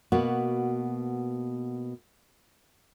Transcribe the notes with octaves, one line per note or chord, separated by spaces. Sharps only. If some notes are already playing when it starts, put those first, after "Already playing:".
B2 A#3 B3 F#4